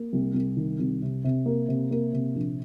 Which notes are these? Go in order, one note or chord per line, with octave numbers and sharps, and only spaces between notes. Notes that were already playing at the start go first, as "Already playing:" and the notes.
Already playing: A#3
C2
C2
D#3
C2
C3
C3
A#3
C3
A#3
C3
A#1